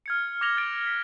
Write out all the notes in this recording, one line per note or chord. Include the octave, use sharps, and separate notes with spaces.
F6 G#6 C#7
D6 G#6 A#6 F7 G7
F#6 A6 D7
B6